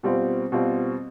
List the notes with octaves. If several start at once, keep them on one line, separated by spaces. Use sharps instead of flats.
B2 G3 C4 F4
B2 G3 C4 F4